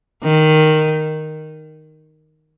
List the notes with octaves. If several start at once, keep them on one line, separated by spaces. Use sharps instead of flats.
D#3